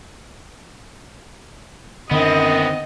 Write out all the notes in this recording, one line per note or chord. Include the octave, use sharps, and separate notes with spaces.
F#2 D3 D#3 B3 C4 D#5